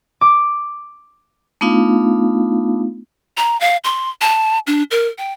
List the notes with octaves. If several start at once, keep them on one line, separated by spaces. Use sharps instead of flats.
D6
A3 B3 D4 D#4 F4 F5
A#5
F5
C6
A5
D4
A#4
G5